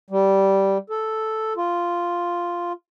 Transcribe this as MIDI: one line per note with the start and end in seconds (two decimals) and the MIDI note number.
0.10 0.78 55
0.90 1.53 69
1.56 2.72 65